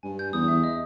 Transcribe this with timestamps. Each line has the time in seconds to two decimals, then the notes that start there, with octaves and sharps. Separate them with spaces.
0.03 G2 G#5
0.19 G6
0.33 E2 D#6
0.48 E5
0.64 D#5